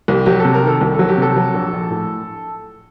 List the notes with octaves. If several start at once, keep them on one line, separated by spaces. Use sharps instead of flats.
C2 G4
F#3 G4
C3 A4
A#4
D#3 A4
C2
F#3 A4
G4
C3 A4
F#3
A#1
A#1
A2